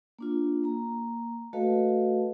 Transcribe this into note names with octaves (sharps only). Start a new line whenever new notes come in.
A#3 D4 F4
A#3 A#5
A3 F#4 A4 B4 D#5 F5